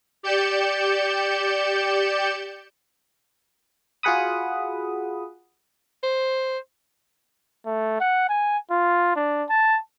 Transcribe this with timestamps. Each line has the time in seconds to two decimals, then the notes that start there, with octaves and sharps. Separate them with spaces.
0.23 G4 D5 G6 C#7 E7
4.03 F4 F#4 G#4 F#5 B5 D#6
6.03 C5
7.66 A3
8.00 F#5
8.29 G#5
8.71 F4
9.16 D4
9.49 A5